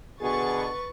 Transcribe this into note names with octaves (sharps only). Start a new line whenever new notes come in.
B2 D3 G#4 B4 C#6 A6